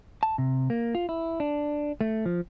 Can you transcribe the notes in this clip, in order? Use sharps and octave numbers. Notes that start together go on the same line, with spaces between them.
A5
C3
A#3
F4
E4
D4
A3
F3